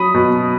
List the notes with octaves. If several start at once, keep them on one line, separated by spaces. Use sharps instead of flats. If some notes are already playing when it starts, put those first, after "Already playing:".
Already playing: F#3 B5 D#6
B2